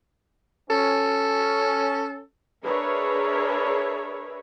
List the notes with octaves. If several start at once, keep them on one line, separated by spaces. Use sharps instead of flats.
C#4 A4
D4 G#4 A#4 B4 C#5 E5